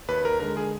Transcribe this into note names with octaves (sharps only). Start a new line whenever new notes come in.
D#2 B4
A#4
D3 G#3 A#4
G#4